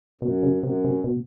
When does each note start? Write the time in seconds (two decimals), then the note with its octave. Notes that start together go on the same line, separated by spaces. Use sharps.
0.21 F#2 B2
0.43 C#3
0.63 F#2 C3
0.84 C3
1.04 B2